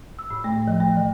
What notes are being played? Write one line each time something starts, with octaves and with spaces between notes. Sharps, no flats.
E6
A2
A3
F3
A3
E3